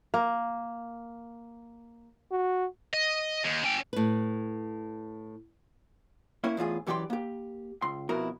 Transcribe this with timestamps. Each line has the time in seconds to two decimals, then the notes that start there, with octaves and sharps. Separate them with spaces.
0.14 A#3
2.32 F#4
2.94 D#5
3.45 D#2
3.64 C#4 G5
3.93 A2 B4
6.44 A#3 C#4 E4 C#5
6.57 E2 A2 F4 G#4
6.87 F#2 E3 G4 D5 G5 C6
7.10 A#3 G4
7.82 C#2 C6
8.09 F2 B2 E4 F#4 A#4 A#5